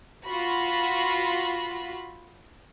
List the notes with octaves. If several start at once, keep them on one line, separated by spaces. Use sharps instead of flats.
F4 F#4 B5